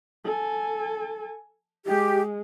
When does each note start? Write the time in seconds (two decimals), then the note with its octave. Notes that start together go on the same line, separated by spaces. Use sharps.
0.25 A4 G#5
1.85 G#3 G4